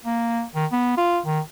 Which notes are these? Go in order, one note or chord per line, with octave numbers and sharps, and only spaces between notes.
A#3
D#3
B3
F4
D#3